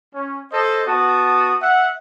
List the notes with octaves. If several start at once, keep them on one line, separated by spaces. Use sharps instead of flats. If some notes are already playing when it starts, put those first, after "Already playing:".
C#4
A4 C5 D#5
B3 F#4 A5 D#6
E5 F#5